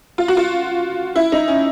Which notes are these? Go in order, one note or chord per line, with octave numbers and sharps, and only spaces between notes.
F4
F#4
F4
E4
D#4
C#4